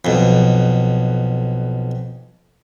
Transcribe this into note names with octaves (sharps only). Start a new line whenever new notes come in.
B1 F2